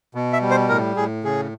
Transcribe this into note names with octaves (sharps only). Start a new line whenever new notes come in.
B2
E5
G3
C5
A2 A#4
A2 G#4
C#3 G#4